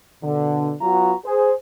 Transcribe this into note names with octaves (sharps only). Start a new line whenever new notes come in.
B2 D3
F#3 B3 F4 F#4 A#5
G#4 C5